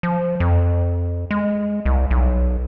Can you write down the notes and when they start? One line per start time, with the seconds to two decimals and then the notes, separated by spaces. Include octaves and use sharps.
0.03 F3
0.40 F2
1.31 G#3
1.86 C2
2.11 B1